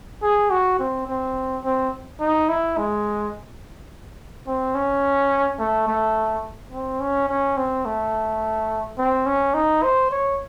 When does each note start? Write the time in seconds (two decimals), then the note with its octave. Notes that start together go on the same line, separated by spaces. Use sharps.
0.22 G#4
0.51 F#4
0.80 C4
1.07 C4
1.64 C4
2.20 D#4
2.49 E4
2.77 G#3
4.47 C4
4.75 C#4
5.59 A3
5.87 A3
6.72 C4
7.00 C#4
7.29 C#4
7.57 C4
7.85 A3
8.98 C4
9.26 C#4
9.54 D#4
9.83 C5
10.11 C#5